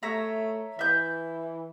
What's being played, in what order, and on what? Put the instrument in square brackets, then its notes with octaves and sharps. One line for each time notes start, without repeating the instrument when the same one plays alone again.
[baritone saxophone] A3 [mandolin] C#5 E5 A#5
[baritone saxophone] E3 [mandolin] E5 G6